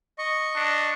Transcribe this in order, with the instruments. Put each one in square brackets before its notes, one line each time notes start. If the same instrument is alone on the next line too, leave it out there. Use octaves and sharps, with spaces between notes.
[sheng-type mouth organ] D#5 C#6
[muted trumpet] D4